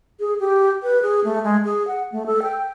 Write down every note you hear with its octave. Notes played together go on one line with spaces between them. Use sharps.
G#4
G4
B4
G#4
A3
G#3
G#4
F#5
A3
A4
G5